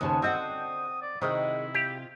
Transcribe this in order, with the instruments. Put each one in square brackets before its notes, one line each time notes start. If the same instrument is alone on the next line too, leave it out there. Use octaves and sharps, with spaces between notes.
[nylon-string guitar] D#2 C#3 C5 [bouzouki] B3 F#4 A5 [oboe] D#6
[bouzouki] D3 C5 G5 [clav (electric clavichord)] C4 [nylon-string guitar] F#4 D#5 F#5
[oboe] D5
[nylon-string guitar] C3 C5 [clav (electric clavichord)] D#3 [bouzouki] G#3 D#4 F#4 [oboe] E4
[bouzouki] F4 [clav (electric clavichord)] G4